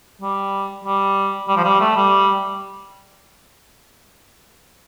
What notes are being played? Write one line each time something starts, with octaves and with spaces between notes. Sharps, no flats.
G3
G3
G3
F3
G3
A3
G3